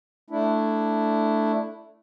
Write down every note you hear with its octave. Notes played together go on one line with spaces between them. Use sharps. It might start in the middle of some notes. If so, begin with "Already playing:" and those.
A3 D4 E4